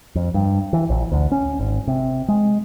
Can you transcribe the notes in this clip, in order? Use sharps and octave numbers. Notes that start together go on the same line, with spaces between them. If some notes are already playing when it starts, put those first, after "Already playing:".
F2
G2
E3
A#1
D2
C#4
G#1
C3
G#3